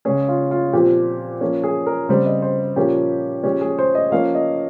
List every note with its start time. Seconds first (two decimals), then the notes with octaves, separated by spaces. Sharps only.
0.05 C#3 G#3 C#4 G#4
0.28 F4
0.51 F4
0.73 A#2 F3 C4 G4
1.41 F3 A#3 C#4
1.64 G#4
1.86 A#4
2.09 C#3 G3 C4 C5
2.26 D#5
2.42 C5
2.76 A#2 F3 A#3 C#4 G4
3.44 F3 G#3 C#4 G4
3.61 G#4
3.79 C5
3.95 D#5
4.12 F3 A#3 C#4 F5
4.35 D#5